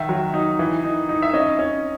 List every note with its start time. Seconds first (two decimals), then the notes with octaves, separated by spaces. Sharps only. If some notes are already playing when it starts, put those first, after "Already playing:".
Already playing: D#3 E5
0.09 F#3
0.34 D#4
0.59 E3
0.84 D#4
1.09 D#4
1.22 E5
1.33 C#4 D#5
1.59 C#4